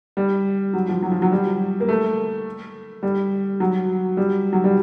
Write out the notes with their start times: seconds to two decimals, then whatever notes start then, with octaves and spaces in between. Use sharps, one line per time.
0.17 G3
0.73 F#3
0.88 F3
1.02 F#3
1.12 F3
1.22 F#3
1.32 G3
1.80 A#3
1.89 A3
3.03 G3
3.60 F#3
4.17 G3
4.53 F#3
4.64 G3